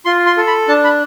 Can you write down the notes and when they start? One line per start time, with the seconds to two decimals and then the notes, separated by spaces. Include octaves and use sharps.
0.05 F4 C6
0.26 C6
0.37 A4
0.47 B5
0.68 D4 A5
0.84 B5